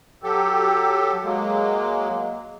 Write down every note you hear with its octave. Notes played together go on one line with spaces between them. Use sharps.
F#3 G4 A4
F#3 G#3 A#3